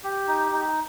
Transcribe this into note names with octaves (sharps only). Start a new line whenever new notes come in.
G4
D#4
D#4